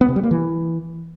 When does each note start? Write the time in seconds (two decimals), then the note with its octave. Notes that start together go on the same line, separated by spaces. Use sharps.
0.01 B3
0.08 C3
0.16 G3
0.23 A#3
0.31 E3